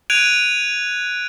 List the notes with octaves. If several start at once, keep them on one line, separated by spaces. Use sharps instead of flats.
F#6 G#6 D7 D#7 F7